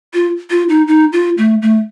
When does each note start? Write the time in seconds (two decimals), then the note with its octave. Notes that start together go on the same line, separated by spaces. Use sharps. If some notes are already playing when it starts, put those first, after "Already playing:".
0.14 F4
0.50 F4
0.69 D#4
0.88 D#4
1.13 F4
1.38 A3
1.62 A3